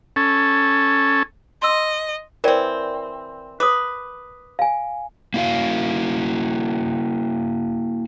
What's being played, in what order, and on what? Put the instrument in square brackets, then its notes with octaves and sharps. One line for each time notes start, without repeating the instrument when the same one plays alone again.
[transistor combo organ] C#4 A4
[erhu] D#5 [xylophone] C6 E6
[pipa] E3 C4 [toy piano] A#4 D5 G5
[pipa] B4 [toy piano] D6 D#6
[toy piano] F5 G#5
[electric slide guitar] A#3 E4 F#4 F5